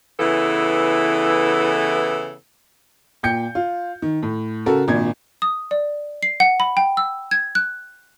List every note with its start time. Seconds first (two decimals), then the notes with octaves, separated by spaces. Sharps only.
0.20 C#3 E3 B3 E4 A4
3.23 A#2 G5 G6 C#7
3.55 F4
4.02 D#3
4.23 A2
4.66 C#3 F#4 A4 A#4
4.88 G#1 A#2 D4 G#6
5.42 D#6
5.71 D5
6.23 C7
6.40 F#5
6.60 B5
6.77 G5
6.97 E6
7.31 G#6
7.55 F#6